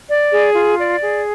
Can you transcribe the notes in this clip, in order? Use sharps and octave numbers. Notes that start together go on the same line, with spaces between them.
D5
G#4
F4
D5
G#4